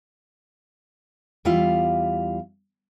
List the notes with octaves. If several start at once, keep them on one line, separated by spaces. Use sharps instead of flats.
E2 G3 E4 F4 F5